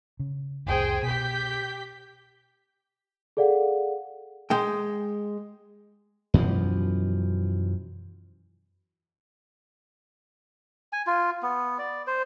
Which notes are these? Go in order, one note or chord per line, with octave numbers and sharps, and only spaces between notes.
C#3
F1 C2 A2 G#4 C5 G5
B2 G4 G6 B6
G#4 A4 D5 F5 F#5
G#3 G5
F#2 B2 E3 F3
G#5
F4
B3
D5
C5